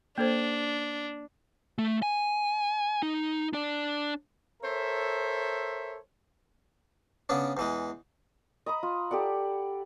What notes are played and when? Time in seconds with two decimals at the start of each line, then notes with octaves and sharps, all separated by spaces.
0.18 A#3 D4 A4 C5
1.78 A3
2.02 G#5
3.03 D#4
3.53 D4 D5
4.62 A4 A#4 C5 C#5 E5
7.29 C#3 B3 C#4 D4
7.57 E2 E3 G#3
8.66 D#5 A#5 B5 D#6
8.83 F4
9.11 G4 A4 D5 F#5